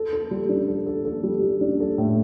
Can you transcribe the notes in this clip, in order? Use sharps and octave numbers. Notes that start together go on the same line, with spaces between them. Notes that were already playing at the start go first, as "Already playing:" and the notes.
Already playing: A4
A4
G3
D4
A4
A4
A4
G3
G3
D4
A4
A2